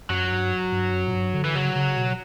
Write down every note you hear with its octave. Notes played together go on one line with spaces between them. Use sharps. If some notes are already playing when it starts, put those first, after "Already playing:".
F#2 F#3
G2
G2
F#2
A#2
G2
D3
E3
C#3 F#3
C#3
B2